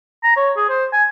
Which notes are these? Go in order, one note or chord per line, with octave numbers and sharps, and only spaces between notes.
A#5
C#5
G#4
C5
G#5